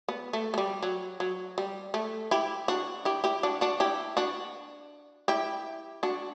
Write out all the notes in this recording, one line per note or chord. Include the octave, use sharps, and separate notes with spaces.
B3
A3
A3
G3
F#3
F#3
G3
A3
E4 G4
D4 F#4
E4 G4
E4 G4
D4 F#4
D4 F#4
E4 G4
D4 F#4
E4 G4
D4 F#4